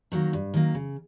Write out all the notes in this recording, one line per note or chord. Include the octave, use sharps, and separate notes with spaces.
D#3 F#3 A#3
G2
D#3 F#3 A#3
C#3